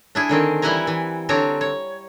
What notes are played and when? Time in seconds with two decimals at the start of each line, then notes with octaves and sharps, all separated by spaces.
0.15 D4 E4 G#4
0.29 D3 D#3 C4
0.62 E3 G3 E4 F#5 G#5 A#5
0.87 E3
1.29 D3 C4 D4 C#5 A#5
1.61 C#5